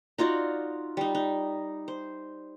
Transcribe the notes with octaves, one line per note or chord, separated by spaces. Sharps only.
D#4 F4 F#4 D5
G3 D#4
D#4
C5